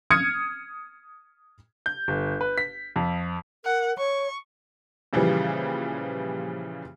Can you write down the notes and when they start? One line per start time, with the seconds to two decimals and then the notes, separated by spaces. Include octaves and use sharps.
0.10 D#6 F6 G#6 C#7
1.86 G6
2.08 G1
2.41 B4
2.58 B6
2.96 F2
3.65 A#4 F#5
3.98 C#5 C#6
5.13 A#2 C#3 E3 F3 G3